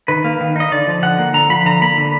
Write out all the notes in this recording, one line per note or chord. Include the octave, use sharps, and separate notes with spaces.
D#3 B4
A#3
D#3
D#4 D#5
D3 D5
F3
D3 F#5
A#3
D3 A#5
F3 B5
D3 A#5
A#3 B5
D3